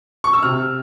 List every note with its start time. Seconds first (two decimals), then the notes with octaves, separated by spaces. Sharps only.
0.24 C#6
0.33 E6
0.43 C3 F6